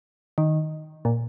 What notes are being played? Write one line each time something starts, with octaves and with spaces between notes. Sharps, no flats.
D#3
A#2